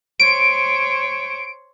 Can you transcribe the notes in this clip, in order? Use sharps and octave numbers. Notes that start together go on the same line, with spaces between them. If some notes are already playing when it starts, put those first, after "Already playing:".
C5 C#5 D7